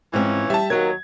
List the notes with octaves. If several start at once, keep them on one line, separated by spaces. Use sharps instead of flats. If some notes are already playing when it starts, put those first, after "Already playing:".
G#2 E3 F3 C4 C#4
G3 E5 A5
D#2 F#3 A#4 D#5 G#6